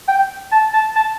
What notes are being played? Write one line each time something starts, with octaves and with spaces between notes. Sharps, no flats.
G5
A5
A5
A5